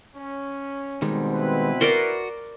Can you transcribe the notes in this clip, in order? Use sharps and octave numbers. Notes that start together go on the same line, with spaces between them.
C#4
B2 D#3 G3 G#3 C4
E4 B4
F#4 A#4 D5 C6